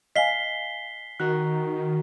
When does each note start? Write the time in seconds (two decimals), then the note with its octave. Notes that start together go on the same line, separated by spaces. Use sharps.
0.16 D#5 F5 G#5 F6 B6 C7 G7
1.20 D#3 F#4 A#4 F#6